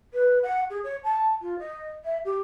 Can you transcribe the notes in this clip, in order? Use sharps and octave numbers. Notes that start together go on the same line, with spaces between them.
B4
F#5
G#4
C#5
A5
F4
D#5
E5
G4